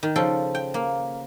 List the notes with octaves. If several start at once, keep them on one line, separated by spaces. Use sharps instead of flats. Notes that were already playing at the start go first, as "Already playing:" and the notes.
D#3
C#3 F3 A4 G5
G5
A#3